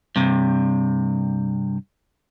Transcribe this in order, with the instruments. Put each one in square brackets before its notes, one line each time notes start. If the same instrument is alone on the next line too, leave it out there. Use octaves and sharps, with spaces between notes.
[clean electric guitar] G2 C3